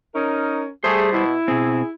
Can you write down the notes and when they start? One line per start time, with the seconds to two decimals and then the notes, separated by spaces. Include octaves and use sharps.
0.15 C#4 D#4 A#4
0.84 G3 A3 G#4 C5
1.13 B2 E4
1.48 B2 C4 G#4